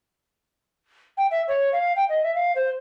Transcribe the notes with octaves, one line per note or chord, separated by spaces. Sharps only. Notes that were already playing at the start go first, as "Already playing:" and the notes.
G5
E5
C#5
F5
G5
D#5
E5
F5
C5